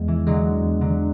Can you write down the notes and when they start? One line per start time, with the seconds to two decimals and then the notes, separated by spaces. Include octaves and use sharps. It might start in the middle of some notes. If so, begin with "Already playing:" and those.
Already playing: E2 G#3
0.08 E3
0.27 D3 F#3 G#3
0.63 E2
0.81 D3 F#3